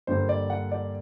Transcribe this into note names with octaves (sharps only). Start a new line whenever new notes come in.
G2 D3 G3 A#3 C5
D5
F#5
D5